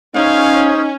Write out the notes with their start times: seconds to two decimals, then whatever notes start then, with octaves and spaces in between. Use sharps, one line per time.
0.15 C#4 D#4 G#4 C5 C#5 F5